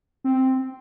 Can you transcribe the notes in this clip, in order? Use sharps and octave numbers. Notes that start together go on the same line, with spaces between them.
C4